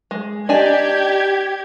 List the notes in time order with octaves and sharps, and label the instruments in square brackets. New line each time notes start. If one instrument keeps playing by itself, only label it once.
[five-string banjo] G#3
[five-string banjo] D4 D#4 G#5 [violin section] G4 G#6